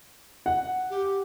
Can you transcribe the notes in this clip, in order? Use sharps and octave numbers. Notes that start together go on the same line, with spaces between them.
F#5
G4